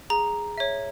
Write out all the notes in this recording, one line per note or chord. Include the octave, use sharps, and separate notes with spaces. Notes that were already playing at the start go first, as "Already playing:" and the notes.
G#4 A#5
C#5 E5